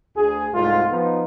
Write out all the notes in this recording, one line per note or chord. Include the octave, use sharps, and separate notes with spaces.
D2 G#4
C2 G#2 A3 F4
F3 B3 D#4 F4